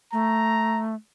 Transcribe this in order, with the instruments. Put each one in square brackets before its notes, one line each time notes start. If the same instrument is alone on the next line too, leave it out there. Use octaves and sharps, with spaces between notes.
[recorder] A3 [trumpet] A#5